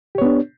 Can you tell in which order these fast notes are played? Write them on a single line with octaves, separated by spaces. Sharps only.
G4 C#5 B3 D4